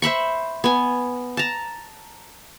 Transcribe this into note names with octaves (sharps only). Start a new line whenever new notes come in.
C5 E5 B5 C#6
B3 G#5
A5 A#5